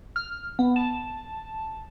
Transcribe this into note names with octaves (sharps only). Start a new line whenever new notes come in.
F6
B3
A5